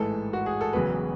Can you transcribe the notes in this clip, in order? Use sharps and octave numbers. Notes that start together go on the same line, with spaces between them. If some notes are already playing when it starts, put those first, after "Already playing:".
Already playing: A1 G#2 E3 A4
F#4
G#4
A4
E1 E2 C#3 F#3 B3 B4